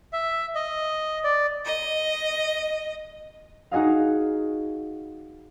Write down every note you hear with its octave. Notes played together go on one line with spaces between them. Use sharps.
E5
D#5
D5
D#5
D#4 F#4 G#4 D#5 F5